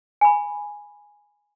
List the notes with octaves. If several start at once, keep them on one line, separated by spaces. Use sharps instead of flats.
G#5 B5